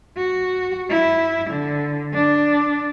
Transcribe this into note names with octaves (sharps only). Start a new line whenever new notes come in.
F#4
E4
D3
D4